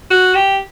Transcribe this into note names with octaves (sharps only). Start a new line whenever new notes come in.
F#4
G4